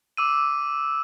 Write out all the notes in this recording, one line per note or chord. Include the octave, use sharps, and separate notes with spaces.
D6 E6 D#7